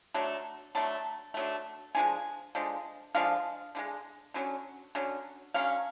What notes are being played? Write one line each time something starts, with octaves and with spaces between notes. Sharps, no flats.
D3 F#3 A3
D3 F#3 A3 A5
D3 F#3 A3
D3 F3 G#3 G#5
D3 F3 G#3
D3 F3 G#3 F5
D3 F3 G#3
D3 F#3 C#4
D3 F#3 C#4
D3 F#3 C#4 F5